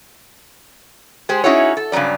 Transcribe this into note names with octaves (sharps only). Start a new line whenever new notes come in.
G#3 G4 G#4 C5
C#4 D#4 E4 F#4 G#4 C#5
A4
G2 C#3 F#3 G3 D5